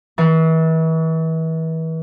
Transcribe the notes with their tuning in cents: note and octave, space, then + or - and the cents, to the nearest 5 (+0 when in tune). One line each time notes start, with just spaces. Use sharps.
E3 -35